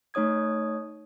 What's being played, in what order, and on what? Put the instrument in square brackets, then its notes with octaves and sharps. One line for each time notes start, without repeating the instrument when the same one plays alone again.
[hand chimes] A3 D#4 C#5 D#6 G#6